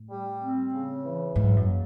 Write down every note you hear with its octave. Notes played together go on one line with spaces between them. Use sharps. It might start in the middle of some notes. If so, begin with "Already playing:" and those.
Already playing: A2
G3
C4
C#3
E3
G#2 F#3
F#2
A#3